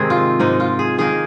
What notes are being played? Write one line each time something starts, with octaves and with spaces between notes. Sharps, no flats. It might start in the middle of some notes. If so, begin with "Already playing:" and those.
Already playing: G#2 C3 D#3 G#3 C4 G#4 C5
F4
G#2 G#3 D#4
F4
G#4
D#3 A#3 D#4 G#4